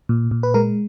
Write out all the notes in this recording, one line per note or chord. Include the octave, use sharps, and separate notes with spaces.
A#2
A#2
B4
G#3 A#4